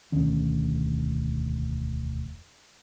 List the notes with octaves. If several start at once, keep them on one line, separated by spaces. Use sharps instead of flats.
E1 D2 D#3 C#4